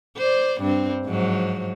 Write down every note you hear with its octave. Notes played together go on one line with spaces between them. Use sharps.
C5 D5
G2 C4
G#2 F3 F#3